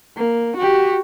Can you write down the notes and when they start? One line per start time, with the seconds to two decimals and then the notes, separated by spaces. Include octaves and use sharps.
0.17 A#3
0.57 F#4 G4